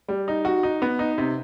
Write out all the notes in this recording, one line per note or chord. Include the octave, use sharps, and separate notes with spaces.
G3
D#4
F#4
D#4
B3
D#4
C3